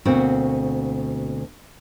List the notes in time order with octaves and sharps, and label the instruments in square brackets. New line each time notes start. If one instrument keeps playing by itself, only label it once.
[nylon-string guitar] D2 B2 A#3 C4 F#4 F#5